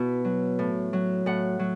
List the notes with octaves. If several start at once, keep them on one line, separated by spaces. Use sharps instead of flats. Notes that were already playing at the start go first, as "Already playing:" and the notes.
Already playing: B2 E4 F#4
F#3
A2
F#3
A2 F#5
F#3